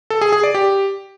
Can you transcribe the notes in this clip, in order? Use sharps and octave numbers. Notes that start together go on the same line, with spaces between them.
A4
G#4
G#4
D5
G4